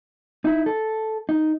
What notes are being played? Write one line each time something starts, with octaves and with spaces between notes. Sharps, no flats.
D#4 E4
A4
D#4